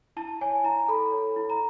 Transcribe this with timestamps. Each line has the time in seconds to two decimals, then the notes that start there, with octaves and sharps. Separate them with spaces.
0.17 E4 A5
0.41 C#5 G#5
0.64 E4 A#5
0.88 A4 B5
1.12 C#5
1.36 E4
1.50 A#5